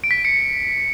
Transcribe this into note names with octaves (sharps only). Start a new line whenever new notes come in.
D7
B6
D7
C#7